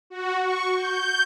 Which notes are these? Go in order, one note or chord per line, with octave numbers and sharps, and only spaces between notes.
F#4
C#6
G6